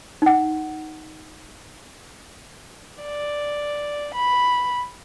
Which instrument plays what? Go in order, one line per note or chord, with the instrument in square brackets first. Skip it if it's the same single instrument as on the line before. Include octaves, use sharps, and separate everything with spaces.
[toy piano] D#4 F#5
[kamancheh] D5
B5